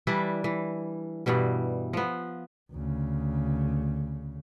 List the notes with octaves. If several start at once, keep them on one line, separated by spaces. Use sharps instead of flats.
E3 G3 D4 E4
E3
G2 B2 E3 G3
F3 B3
D2 C#3